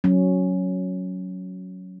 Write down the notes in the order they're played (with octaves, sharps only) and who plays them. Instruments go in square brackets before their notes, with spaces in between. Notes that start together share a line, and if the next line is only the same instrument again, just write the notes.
[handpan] F#3 C#4